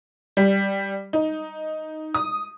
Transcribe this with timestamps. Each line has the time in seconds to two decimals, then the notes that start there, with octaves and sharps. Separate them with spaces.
0.37 G3
1.13 D#4
2.15 D#6